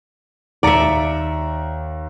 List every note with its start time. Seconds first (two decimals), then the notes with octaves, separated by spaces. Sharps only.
0.63 D#2 D5 E5 A#5 C#7